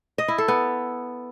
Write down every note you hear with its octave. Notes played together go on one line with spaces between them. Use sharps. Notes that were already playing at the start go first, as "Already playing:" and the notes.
D#5
E4
A4
B3